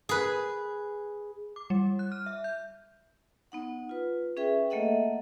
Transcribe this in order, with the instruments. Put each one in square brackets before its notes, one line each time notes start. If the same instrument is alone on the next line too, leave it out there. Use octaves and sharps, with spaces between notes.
[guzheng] G#4 B4
[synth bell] D6
G3
F#6
F6
E5
G6
[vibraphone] B3 D#4 F#5
F4 B4
C#4 G#4 B4 E5 G5
A3 A#3 A4 D#5 E5 F#5